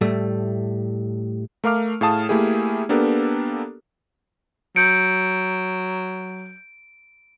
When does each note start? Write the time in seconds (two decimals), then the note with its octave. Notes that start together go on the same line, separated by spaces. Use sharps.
0.01 A2 G3 A3
1.64 A3 A#4 F5 D6 F6
2.01 A2 G#4 F5 A5 D#6
2.29 A3 A#3 E4 G4 G#4
2.89 A#3 B3 D4 G4 A4 A#4
4.76 F#3 G6 C#7 D7